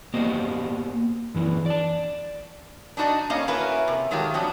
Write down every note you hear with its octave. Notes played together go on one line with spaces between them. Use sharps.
A#3 B3 G4 C5 D5 D#5
F#2 E3 E4
D5 A5
D4 D#4 F#4 A#4 D5 D#5
A2 A#3 C#4 D5 D#5 F5
A#3 C#4 E4 F#4 A#4 B4
C3
D#3 F#3 G#3 A3 F4 G4
F3 F#3 B3 C#4 D4